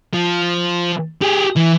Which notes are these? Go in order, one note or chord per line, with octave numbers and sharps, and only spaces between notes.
F3
G4 G#4
E3